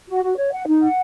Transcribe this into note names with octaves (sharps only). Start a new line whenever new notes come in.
F#4
F#4
C#5
F#5
D#4
F#5